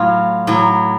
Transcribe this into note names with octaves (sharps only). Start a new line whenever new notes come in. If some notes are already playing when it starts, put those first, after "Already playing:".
Already playing: A2 F#3 F4
A2 F#3